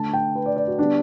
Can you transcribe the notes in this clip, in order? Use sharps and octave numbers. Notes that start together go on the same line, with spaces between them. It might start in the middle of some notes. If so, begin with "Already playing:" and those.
Already playing: D3 A3 A5
G5
B4
D5
D5
F#4
D3 G3 B3 D4